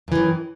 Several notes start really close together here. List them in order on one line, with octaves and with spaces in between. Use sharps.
F#2 E3 D#3